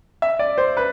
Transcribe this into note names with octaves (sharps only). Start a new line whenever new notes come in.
E5
D5
C5
B4